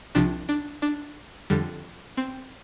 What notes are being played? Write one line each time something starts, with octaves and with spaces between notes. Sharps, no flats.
C2 C3 F3 D4
D4
D4
F2 D3 G3
C4